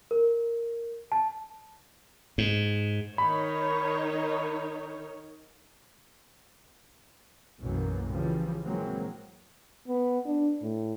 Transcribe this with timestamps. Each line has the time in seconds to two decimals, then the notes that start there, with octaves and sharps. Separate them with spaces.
0.11 A#4
1.12 A5
2.38 G#2
3.18 D#3 D#4 C#5 B5
7.60 B1 F#2 B2 E3 A#3
8.11 C#3 E3 F3 G3
8.63 A#2 E3 F#3 G#3 A#3 C4
9.88 B3
10.25 D4
10.62 A2